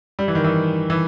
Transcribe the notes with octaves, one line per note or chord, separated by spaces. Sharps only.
G3
E3
D#3
E3
E3